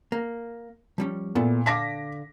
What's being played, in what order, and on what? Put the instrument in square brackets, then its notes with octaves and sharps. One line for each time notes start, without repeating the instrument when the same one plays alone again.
[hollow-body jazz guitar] A#3
F3 G3 C#4
[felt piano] A#2 [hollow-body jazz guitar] B3 E4 A4
[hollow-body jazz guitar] D3 F5 A5 [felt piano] D6 A#6 B6